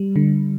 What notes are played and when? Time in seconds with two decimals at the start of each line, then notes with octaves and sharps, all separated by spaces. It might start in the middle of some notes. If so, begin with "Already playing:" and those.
Already playing: G3
0.16 D3